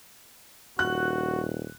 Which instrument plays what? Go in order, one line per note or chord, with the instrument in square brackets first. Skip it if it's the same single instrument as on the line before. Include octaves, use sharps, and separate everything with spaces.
[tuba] D#1 [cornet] F#4 [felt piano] F#6